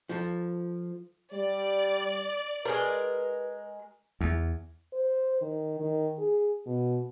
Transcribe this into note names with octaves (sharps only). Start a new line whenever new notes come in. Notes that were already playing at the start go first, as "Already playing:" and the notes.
F3 A4
G3 D5
G#3 A#4 B4
E2
C5
D#3
D#3
G#4
B2